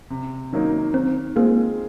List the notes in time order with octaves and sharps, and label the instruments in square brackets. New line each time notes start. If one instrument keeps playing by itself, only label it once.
[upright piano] C3
D#3 F#3 A#3 D#4
[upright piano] D#3 [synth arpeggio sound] C4
[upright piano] G#3 C4 F4 G#4 [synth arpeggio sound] A#3